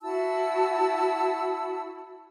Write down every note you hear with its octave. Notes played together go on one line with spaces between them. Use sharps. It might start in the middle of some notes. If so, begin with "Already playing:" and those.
E4 F#4 A5 E6